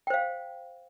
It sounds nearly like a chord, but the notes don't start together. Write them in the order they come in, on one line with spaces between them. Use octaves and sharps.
G5 C5 F5